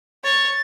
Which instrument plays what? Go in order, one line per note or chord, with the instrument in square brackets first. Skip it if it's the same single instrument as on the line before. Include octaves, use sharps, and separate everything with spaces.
[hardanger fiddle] C#5 [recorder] A6